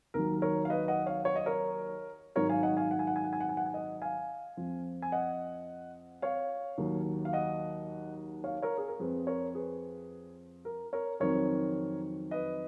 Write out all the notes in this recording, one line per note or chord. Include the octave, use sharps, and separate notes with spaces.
D#2 D#3 F#3 A#4
A#4 C#5
F5
B4 D#5
D#5 F#5
C#5 F5
C#5
D#5
A#4 C#5
G#2 D#3 F#3 A#4 C#5
F5 G#5
D#5 F#5
F5 G#5
F#5
G#5
F#5
G#5
F#5
G#5
F#5
G#5
F#5
G#5
D#5 F#5
F5 G#5
F2 F3
G#5
D#5 F#5
C#5 F5
D#2 D#3 F#3
F5
D#5 F#5
C#5 F5
A#4 C#5
G#4
A#4
F2 F3 G#4 B4
A#4 C#5
G#4 B4
A#4
A#4 C#5
F2 D#3 F#3 A#4 C#5
B4 D#5